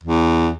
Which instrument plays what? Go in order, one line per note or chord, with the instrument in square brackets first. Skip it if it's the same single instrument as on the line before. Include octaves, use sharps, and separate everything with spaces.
[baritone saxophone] E2